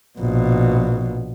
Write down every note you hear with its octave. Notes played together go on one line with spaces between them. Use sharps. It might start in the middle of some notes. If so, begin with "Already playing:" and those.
A#1 B2